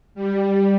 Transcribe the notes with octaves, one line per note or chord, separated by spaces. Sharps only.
G3